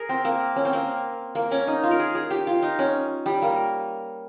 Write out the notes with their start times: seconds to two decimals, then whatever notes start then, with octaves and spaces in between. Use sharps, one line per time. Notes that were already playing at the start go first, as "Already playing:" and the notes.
Already playing: G#4 A#4
0.09 C4
0.25 A#3
0.56 C#4
0.65 C4
0.73 A#3
1.35 A#3
1.51 C#4
1.67 D#4
1.84 F4
1.91 A#4
2.00 G#4
2.15 G#4
2.30 G4
2.47 F4
2.63 D#4
2.79 C#4
3.26 G3
3.42 A#3